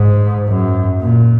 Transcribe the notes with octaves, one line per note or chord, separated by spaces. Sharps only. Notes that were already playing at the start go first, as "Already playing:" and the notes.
Already playing: G#2
F#2
A#2